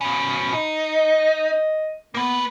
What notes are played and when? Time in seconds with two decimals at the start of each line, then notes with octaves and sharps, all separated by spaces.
0.01 B2 C#4 B5
0.53 D#4
0.95 D#5
2.14 A#3 B3 B4